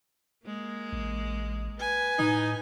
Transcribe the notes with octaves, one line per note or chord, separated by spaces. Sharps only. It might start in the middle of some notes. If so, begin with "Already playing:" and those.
G#3 A#3
A1
B4 G#5
A2 D#4